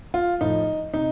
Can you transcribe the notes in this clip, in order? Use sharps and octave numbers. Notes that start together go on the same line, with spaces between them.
F4
A2 F3 D#4
C3 D#4